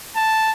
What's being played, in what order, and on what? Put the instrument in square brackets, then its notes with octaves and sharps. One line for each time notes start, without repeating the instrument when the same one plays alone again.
[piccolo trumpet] A5